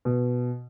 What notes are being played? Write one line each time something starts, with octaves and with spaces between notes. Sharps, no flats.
B2